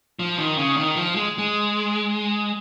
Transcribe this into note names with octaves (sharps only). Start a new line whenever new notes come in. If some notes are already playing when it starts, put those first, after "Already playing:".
F3
D#3
C#3
D#3
F3
G#3
G#3